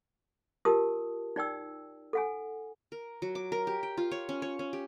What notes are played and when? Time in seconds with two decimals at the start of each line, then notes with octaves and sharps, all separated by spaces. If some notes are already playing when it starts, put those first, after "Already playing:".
0.65 F4 G4 A#4 A5 D#6
1.36 D#4 D5 G5 E6
2.13 A4 F#5 G#5
2.92 A#4
3.22 F#3
3.35 D6
3.52 A#4
3.67 G4
3.83 G5
3.97 F4
4.11 C#5
4.29 C#4
4.42 C#5
4.59 C#4
4.73 G4